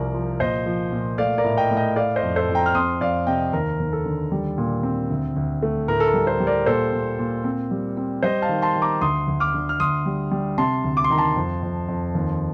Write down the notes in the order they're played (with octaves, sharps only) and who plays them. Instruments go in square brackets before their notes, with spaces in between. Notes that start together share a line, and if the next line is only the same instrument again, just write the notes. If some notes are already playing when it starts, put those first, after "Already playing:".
Already playing: [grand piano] C2 F3 A#4 D5
F3
A#2 C5 D#5
F3
A#2
A3 D5 F5
A#4 D5
A2
D#5 G5
A2
D#5 G5
A3 D5 F5
C5 D#5
F2
A4 C5
F2
G5 A#5
F6
C4 C6 D#6
F2 D5 F5
C3 D#5 G5
D#2 A#4
D#2
A4
D3
G3
A#2
C4
D2
D2
A3
A2 A#4
A4
A#4
G3
A4 C5
G3
A#4 D5
A#2 A4 C5
A#2
A#2
C4
G3
C4
G3 C5 D#5
F5 A5
D#3
A5 C6
D#3
A#5 D6
D2 C6 D#6
D2
D6 F6
D3
F6
D2 C6 D#6
G3
G3
C3 A5 C6
D2
D6
C6
D#3 A#5
A5 C6
F2
F2
F2
D#2